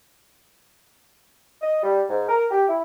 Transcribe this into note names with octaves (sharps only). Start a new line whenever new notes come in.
D#5
G3
G#2
A#4
G4
E4